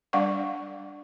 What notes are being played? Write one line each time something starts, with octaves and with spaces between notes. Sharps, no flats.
G3 D4 D5 F5 F#5 C#6